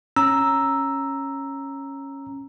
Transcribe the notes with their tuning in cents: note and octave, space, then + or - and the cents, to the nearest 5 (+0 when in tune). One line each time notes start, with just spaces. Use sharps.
C#4 -10 A#5 +0 E6 +0